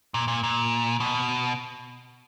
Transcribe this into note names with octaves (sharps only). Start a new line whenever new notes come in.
A#2
A#2
A#2
B2